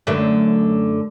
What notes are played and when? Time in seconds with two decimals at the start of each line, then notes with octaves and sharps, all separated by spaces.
0.07 F#2 D3 A3